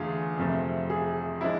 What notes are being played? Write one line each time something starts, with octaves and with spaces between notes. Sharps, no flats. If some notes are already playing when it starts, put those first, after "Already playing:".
Already playing: E2 D3 A3 D4 F4 G#4
F2 C3 F3 A3
G#4
F3 G#3 D4 E4